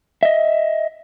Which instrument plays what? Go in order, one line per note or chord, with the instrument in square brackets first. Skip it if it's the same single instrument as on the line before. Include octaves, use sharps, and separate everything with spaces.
[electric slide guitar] D#5 E5